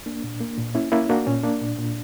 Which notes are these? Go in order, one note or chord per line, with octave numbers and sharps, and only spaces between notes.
A#3 D4
A#2
A#3
A#2
A#3 C#4 E4
A#3 C#4 E4
A#3 D4 F#4
A#2 C#4
A#3 D4
A#2
A#2